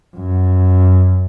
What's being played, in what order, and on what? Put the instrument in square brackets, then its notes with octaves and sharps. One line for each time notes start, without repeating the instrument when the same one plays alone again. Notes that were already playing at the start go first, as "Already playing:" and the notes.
[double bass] F#2